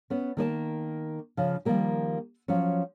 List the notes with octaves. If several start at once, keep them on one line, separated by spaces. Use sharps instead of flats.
B3 C#4
D#3 A#3 D5 A5
C#3 F3
D#3 F3 G3 G#3 A#3 G4
F3 F#3 C#4